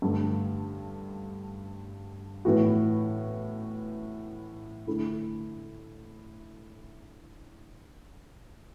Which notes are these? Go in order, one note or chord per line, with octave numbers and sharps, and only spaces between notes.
G2 D3 A3
A2 E3 B3 F#4
D3 A3 E4